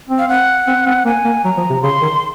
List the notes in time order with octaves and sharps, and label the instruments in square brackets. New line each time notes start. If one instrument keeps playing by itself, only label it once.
[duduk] C4
[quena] F5
F#5
[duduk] C4
C4
[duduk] A#3 [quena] G#5
[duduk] A#3
[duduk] F#3 [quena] A#5
[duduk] F3
C3
[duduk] C#3 [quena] C6
[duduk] D#3